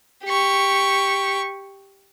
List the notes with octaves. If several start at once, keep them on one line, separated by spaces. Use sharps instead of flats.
G4 C#6